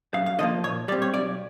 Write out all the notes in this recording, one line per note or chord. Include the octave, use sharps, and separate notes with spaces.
F#2 F5
F5
D3 F3 A#3 D#5
A#2 C#5
G3 C4 D5
C#5
B1 D5